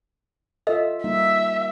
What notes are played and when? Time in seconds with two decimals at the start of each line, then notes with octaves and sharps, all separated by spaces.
0.67 F4 A4 D#5 E5
1.04 G3 A#3 D#4 E5